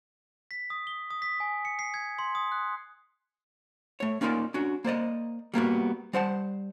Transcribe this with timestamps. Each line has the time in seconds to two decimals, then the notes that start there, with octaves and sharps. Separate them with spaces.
0.51 B6
0.70 D#6
0.87 G7
1.11 D#6
1.22 B6
1.40 G#5
1.65 C#7
1.79 C7
1.94 G#6
2.19 C6
2.35 D#6
2.52 F#6
4.00 A3 C#5
4.21 A#3 C#4 D#4 F4 A#4 D5
4.54 C#4 D4 F#4
4.84 A#3 C5 D5 D#5
5.54 G3 A#3 B3 F#4
6.13 G3 C5 F#5 A5